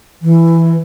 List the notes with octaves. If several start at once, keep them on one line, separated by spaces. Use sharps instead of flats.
E3